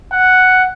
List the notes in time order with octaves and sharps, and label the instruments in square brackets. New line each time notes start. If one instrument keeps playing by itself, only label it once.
[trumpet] F#5